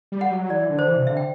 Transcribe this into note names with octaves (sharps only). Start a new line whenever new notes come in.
G3
F#5
F#3
E3 D5
D3
C5
E3
C3
D3 E5
G5